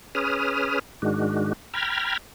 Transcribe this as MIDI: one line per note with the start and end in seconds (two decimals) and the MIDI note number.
0.15 0.79 61
0.15 0.79 68
0.15 0.79 71
0.15 0.79 87
0.15 0.79 89
1.02 1.53 44
1.02 1.53 51
1.02 1.53 56
1.02 1.53 62
1.02 1.53 66
1.74 2.17 79
1.74 2.17 82
1.74 2.17 83
1.74 2.17 89
1.74 2.17 92